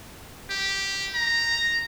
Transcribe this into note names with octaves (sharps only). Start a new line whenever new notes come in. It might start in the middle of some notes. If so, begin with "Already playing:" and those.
G4
A#5